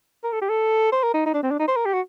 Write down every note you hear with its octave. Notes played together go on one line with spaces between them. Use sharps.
A#4
A4
G4
A4
C5
A#4
D#4
D#4
D4
C4
D4
D#4
C5
A#4
G4
F#4